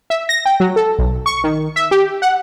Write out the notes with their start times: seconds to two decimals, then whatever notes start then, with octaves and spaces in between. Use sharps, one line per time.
0.10 E5
0.29 A#6
0.45 G5
0.60 F#3
0.76 A4
0.99 B1
1.26 C#6
1.44 D#3
1.76 E5
1.91 G4
2.22 F#5